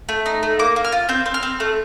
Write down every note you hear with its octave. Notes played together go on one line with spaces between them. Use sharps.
A3
D#4
A3
A#3 D6
A#3
F6
F4
C4 G6
C4
F6
C4
A3